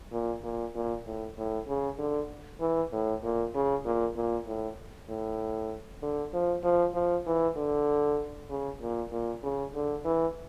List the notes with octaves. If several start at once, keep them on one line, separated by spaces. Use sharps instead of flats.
A#2
A#2
A#2
A2
A2
C#3
D3
E3
A2
A#2
C#3
A#2
A#2
A2
A2
D3
F3
F3
F3
E3
D3
C#3
A#2
A#2
C#3
D3
E3